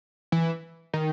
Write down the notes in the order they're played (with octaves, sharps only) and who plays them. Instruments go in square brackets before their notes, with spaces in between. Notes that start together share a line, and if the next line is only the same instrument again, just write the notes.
[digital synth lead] E3
D#3